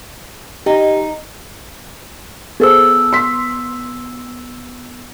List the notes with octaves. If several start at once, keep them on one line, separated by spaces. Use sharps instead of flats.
D#4 G4
B3 G#4 A4 C5 E6
C6 B6